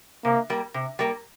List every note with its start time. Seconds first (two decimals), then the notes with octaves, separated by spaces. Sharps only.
0.25 C3 A#3
0.50 G3 A#3
0.74 C3
0.99 G3 A#3